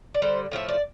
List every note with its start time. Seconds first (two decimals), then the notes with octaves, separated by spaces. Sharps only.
0.14 D5
0.22 D3 G3 C5
0.51 A2 F3 A3 E5
0.69 D5